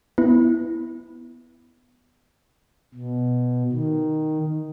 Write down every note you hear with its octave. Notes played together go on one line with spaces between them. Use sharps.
B3 E4
B2
D#3